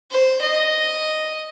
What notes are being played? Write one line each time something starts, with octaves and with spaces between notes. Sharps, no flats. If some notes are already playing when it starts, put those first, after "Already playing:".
C5
D#5